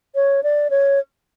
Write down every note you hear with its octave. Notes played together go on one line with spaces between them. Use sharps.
C#5
D5
C#5